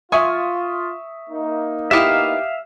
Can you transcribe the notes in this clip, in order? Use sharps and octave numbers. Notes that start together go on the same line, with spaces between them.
F4 E5 G#5 C#6 D#6
A#3 D#4
B3 E4 G4 E5 F5 D6 D#6